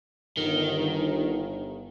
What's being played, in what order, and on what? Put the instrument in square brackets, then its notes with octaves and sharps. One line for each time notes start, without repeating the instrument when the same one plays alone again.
[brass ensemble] G1 [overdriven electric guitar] D#3